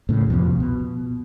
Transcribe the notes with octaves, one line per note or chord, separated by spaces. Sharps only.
A2 C#3
C2 F2 B2 F3
B2